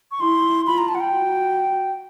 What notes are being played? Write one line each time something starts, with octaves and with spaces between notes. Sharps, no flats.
C#6
E4 C6
F4 B5
A#5
A5
F#5
G5
F#4